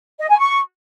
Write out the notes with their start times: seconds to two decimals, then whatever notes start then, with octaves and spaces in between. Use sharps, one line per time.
0.20 D#5
0.29 G#5
0.39 C#6